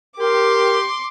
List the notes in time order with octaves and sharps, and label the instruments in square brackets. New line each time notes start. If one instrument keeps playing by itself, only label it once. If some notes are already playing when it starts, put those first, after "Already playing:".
[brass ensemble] G4 [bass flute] A#4 [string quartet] C6 D6